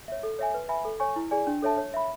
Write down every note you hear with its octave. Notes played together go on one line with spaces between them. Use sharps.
C#5 E5
A4
C#5 E5 G#5
B4
E5 G#5 B5
A4
C#5 G#5 C#6
E4
G#4 D5 G#5
D4
A4 C#5 E5 A5
C#5
E5 B5